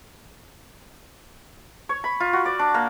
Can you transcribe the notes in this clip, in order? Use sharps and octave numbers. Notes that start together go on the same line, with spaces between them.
C#5
B5
F4
F#4
D5
D4
A#3